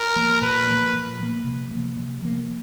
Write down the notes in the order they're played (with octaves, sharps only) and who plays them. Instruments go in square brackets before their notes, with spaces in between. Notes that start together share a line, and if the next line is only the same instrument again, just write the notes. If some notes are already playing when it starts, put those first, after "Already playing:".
Already playing: [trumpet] A#4
[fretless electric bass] F3 A#3
[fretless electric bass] A#2 [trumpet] B4
[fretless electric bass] F3 A#3
A#2
F3 A#3
C3
F3 A#3
C3
F3 A#3